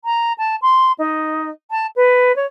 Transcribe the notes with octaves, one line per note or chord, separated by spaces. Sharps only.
A#5
A5
C6
D#4
A5
B4
C#5